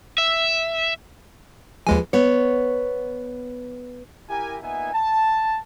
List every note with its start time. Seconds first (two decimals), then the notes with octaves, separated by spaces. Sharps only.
0.18 E5
1.87 D#2 F3 G#3 G#4 B4 G#5
2.13 B3 C#5
4.30 E4 G4 A#4 G#5
4.63 A#2 B3 D#4 E5 G#5
4.94 A5